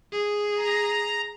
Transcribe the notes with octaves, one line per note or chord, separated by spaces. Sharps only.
G#4
A#5